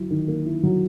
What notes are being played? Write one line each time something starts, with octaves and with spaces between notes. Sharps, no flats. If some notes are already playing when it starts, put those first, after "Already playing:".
Already playing: F#3 E4
D#3
A#3
E4
F#3